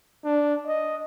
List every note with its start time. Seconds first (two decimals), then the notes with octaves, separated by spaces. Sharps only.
0.24 D4
0.67 D#5